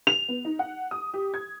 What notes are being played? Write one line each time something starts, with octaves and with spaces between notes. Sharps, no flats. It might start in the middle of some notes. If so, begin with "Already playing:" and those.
F7
B3
D#4
F#5
D#6
G4
G#6